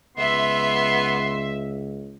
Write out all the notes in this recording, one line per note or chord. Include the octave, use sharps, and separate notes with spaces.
C#2 B3 E5 C6